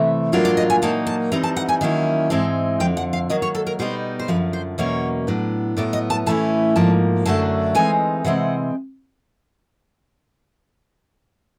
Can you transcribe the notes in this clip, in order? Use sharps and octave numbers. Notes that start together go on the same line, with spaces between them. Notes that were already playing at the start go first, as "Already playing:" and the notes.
Already playing: C3 E3 A3
A2 F#3 A#3 D4 F4
D5
D#5
G#5
A#2 F#3 A#3 D#4 A5
A5
E3 G3 C4 D#4 A#5
A5
F#5
G#5
D#3 F#3 A#3 C#4 E4
G#2 E3 G#3 C4 A5
F2 D3 F3 G5
F#5
F5
D#3 F#3 A#3 D#5
C#5
A4
A#4
B2 G3 B3 D#4 C5
C5
F#2 D3 F3 B4
C5
E2 B2 F#3 A#3 C#4 C#5
A2 F#3 B3 D4
A2 F#3 B3 D5
D#5
A5
A2 E3 A3 C#4 E4 A5
G#2 F3 A#3 A5
F#2 D3 F#3 A3 D4 A5
E3 G#3 C4 D#4 G#5
C3 E3 G#3 C4 F#5